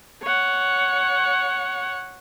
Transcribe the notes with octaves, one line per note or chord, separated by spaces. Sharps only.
C#5 F#5